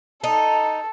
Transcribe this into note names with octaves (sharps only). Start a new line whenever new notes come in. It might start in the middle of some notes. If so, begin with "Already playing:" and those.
D#4 A4